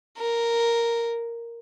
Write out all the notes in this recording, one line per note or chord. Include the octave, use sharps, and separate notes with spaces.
A#4